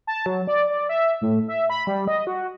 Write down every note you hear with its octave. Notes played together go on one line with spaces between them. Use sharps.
A5
F#3
D5
D5
E5
A2
E5
B5
G3
D#5
F#4